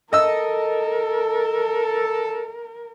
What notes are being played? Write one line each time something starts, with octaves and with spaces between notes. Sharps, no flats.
A4 A#4 D#5 E6